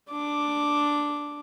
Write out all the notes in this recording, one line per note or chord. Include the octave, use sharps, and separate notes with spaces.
D4 D6